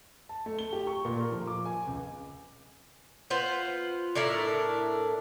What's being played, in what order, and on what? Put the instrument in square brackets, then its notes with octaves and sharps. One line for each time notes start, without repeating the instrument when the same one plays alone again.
[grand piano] A5
A3
G7
G4
C#6
A#2
A#4
F3
D6
G#5
C#2
[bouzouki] B3 F4 B4 C5
A2 D4 E4 A#4